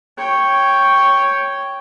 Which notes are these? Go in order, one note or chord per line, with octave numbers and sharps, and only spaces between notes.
C#5 G5